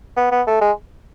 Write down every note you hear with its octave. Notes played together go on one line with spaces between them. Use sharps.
B3
B3
A3
G#3